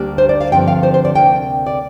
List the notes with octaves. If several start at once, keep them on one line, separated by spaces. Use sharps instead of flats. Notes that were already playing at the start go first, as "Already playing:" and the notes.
Already playing: D2 G3 A#3 D4
C5
D5
F5
G2 D3 F3 C4 G5
F5
C5
C5
D5
D2 C3 A#3 D4 G5
D5